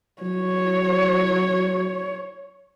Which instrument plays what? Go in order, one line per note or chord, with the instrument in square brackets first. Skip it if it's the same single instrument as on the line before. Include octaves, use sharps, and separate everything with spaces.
[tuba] F#3 [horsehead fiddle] C#5